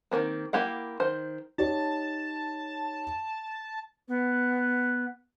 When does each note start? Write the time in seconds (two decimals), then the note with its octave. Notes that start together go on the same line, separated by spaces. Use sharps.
0.11 D#3 F3 A#3 C4
0.53 A#3 E4 G4 F5 F#5
1.00 D#3 C5
1.58 D#4 G4 C#5 A5
4.08 B3